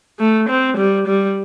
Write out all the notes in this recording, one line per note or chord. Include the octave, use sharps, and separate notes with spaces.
A3
C4
G3
G3